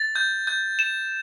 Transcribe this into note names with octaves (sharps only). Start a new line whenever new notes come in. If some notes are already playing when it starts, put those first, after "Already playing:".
Already playing: A6
G6
G6
E7